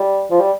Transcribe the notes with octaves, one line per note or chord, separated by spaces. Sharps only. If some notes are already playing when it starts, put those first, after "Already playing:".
Already playing: G3
F3
G3